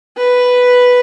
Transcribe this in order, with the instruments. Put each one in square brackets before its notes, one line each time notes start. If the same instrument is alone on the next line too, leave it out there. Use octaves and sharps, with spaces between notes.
[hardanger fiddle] B4